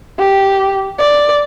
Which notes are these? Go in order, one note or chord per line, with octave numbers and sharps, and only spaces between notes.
G4
D5